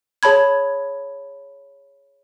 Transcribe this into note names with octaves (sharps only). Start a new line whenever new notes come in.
G#4 C#5 A5 B5 G#6